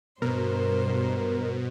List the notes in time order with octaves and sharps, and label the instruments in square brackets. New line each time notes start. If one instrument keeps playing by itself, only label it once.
[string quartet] G2 C5 [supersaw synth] B2 [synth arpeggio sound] A#4